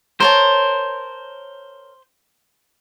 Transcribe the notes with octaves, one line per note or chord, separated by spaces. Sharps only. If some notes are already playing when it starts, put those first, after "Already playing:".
A#4 C5 C#5 A5